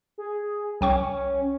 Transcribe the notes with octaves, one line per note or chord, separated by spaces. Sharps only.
G#4
C2 C#4 G5 C#6